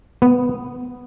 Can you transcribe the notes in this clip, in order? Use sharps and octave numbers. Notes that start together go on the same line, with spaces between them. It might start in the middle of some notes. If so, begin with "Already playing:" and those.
B3